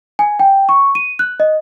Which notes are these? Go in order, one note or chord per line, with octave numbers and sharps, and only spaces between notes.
G#5
G5
C#6
D#7
F#6
D#5